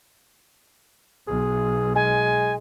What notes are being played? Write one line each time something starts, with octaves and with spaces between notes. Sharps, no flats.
B1 G#4
G#3 G#5